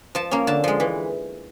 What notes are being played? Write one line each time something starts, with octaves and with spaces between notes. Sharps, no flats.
F3 A5
A#3 C#4
D3 A5
F3 G#3
E3